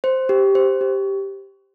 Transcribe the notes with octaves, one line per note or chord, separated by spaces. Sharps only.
C5
G4
C5
G4